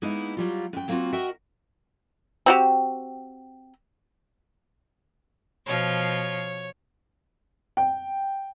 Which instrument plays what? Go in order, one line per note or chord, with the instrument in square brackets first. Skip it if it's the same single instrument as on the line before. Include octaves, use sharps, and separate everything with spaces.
[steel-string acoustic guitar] G#3 A#3 B3 D#4 E4
F#3 G3 F4
F#2 G5
F#3 A#3 C4 D#4 F4 F#4
F#4 A#4 D#5 E5 F#5 G5
[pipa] C4 F#4 G4
[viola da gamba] B2 F3 F4 [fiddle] C#5
[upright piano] G5